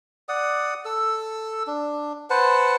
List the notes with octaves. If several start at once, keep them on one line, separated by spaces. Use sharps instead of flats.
D5 F#5 D#6
A4 E6
D4
B4 C5 F#5 A5